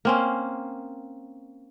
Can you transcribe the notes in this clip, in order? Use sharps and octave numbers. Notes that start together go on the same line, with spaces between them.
A#3 C4 C#4